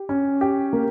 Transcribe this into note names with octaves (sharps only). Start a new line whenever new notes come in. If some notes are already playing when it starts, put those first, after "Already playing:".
Already playing: G4
C#4
G4
A#3